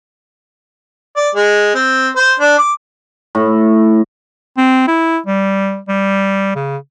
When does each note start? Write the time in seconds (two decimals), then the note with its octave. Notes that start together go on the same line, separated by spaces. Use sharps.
1.16 D5
1.35 G#3
1.75 C4
2.16 C5
2.40 D4
2.58 D6
3.35 A2
4.57 C4
4.88 E4
5.27 G3
5.89 G3
6.56 C#3